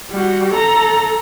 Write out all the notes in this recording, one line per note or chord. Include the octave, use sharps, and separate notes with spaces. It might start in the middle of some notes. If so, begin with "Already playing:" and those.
G3 F#4
A4 A#5